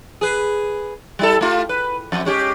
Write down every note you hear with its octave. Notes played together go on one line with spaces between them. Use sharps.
G#4 B4
G3 E4 A4
A3 F4 G4
B4
F2 C4
G#3 C#4 G4